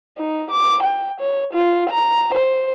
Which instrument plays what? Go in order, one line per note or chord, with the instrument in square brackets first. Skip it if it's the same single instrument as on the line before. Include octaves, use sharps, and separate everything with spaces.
[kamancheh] D#4
D6
G5
C#5
F4
A#5
C5